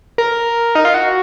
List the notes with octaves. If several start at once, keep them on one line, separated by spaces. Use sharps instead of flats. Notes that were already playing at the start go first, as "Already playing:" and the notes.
A#4
D#4
F4
F#4